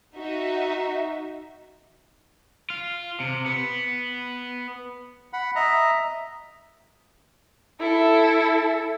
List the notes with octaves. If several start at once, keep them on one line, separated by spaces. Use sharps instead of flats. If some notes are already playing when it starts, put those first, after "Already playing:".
D#4 F#4 E5
F4
C3
B3
F#5 B5
D#5 E5 A#5
E4 A4